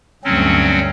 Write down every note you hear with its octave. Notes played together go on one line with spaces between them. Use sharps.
D2 G2 F#3 C4 C#4